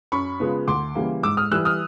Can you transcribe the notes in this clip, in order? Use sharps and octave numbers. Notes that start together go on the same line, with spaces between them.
F#2 B5 C#6
C#3 F3 G#3 B3
D2 C6 D6
C#3 E3 G3 A#3
G#2 D6 E6
D#6 F6
E3 G3 E6 F#6
D#6 F6